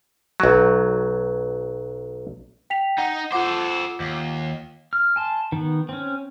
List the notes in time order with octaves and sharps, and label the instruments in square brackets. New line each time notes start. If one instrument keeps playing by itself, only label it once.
[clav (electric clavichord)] B1 F#3
[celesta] G5 B6 F7
[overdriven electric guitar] D#4 [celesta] F#5
[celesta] F4 F#5 D6 [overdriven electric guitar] A4 C5
[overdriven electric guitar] D#2
[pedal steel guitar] F6
G#5 A5 C6
D#3 B3
C4 C#4